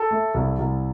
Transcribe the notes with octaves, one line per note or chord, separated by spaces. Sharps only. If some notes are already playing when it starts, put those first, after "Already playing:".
Already playing: A4
A3
C2
C2